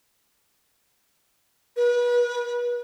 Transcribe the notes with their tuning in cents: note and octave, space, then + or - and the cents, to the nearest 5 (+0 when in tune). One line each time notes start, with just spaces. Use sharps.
B4 -35